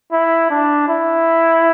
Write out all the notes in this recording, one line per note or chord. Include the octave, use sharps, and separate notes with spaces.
E4
D4
E4